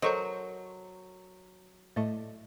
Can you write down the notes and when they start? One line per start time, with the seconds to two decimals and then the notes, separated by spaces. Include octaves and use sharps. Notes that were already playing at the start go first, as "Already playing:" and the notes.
0.02 F#3 A4 A#4 C5 D#5 C#6 G6
1.96 A2 A3 D5 D#5